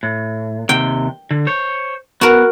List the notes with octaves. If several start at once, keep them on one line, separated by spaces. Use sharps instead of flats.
A2
D#2 C3 G5
D3
C5 C#5
B3 F#4 A#4